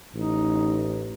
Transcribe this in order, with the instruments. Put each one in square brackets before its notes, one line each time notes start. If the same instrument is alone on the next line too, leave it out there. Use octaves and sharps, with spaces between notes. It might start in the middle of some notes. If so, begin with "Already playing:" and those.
[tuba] A1 [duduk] D#4